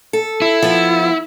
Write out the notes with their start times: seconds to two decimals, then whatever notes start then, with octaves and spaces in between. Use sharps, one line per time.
0.13 A4
0.42 E4
0.62 F3 B3